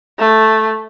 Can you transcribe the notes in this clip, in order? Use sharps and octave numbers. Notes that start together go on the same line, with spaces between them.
A3